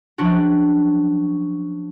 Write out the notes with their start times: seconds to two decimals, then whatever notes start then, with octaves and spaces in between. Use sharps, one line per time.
0.18 F3 F#3 C#4 D4 F#4